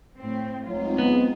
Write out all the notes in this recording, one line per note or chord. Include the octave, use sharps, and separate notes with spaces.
A2 C4
C#2 F#3 G#3 C4 D#4 F4
B3